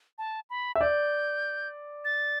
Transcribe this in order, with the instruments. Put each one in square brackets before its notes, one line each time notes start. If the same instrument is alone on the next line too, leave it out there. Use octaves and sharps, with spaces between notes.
[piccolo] A5
B5
[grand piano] E5
[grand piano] D5 [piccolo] G6
[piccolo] A6